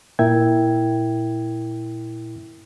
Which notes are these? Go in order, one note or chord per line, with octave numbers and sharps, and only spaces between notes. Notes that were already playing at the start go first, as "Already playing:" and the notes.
A#2 E4 A#4 E5 G5 G#6